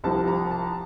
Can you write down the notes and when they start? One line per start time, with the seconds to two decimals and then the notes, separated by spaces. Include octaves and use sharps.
0.04 C2 C3 F3 A5
0.28 A#5
0.51 A5